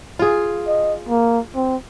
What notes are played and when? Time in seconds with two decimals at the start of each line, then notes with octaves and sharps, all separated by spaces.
0.19 F4 G#4
0.67 D#5
1.09 A#3
1.55 C4